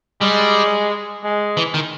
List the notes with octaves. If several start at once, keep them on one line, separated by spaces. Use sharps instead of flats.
G3 G#3
G#3
E3
D#3